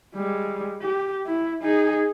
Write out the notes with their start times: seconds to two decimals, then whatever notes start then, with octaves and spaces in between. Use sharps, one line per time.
0.15 G3 G#3
0.81 G4
1.26 E4
1.63 D#4 G#4